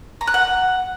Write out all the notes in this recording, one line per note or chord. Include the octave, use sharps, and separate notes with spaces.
A#5
F#6
F#5